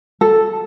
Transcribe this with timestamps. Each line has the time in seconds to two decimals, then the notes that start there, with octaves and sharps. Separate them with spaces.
0.21 A4